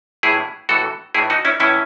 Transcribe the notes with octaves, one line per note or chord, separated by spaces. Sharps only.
A2 E3 E4 G#4
A2 E3 F#4 A4
A2 E3 E4 G#4
D#4 F#4
C#4 E4
A2 E3 C#4 E4